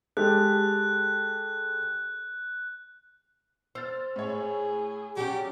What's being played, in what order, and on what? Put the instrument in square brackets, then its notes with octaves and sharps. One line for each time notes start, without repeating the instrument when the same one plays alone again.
[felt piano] G#3 G4 A4 [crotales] F#6
[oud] C5 [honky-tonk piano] E6 F6 A6
[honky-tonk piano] A2 C#5 [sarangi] G#4
[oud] F#3 G3 C#4 [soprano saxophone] G4